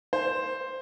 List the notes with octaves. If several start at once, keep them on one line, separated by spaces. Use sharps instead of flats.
C5